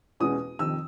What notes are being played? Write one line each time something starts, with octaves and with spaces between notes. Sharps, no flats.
E2 B2 G#3 C#4 D#6
F2 C3 D#3 E6